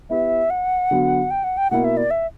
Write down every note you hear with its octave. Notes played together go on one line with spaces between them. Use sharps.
B3 E4 G4 B4 E5
F#5
D3 F#3 B3 F#4
G5
F#5
G5
B2 A#3 E4 F#5
E5
D5
E5